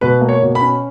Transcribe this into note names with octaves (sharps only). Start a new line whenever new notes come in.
B2 B4
A#3
C#5
B2
B5
C#4